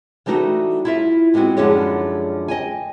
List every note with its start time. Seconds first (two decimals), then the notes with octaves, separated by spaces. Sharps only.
0.26 E3 G3 A3 D#4 F#4
0.85 E4 F4 E5
1.34 G3 G#3 B3 C4 F#4
1.57 F#2 D3 F3 G3 G#3 C#4
2.48 D#5 G5 G#5